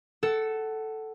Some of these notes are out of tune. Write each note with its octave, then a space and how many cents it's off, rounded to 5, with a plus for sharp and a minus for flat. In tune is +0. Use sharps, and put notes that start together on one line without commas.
A4 +0 F#5 +25 E6 +0